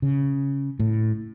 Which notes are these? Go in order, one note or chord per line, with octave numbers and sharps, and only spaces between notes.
C#3
A2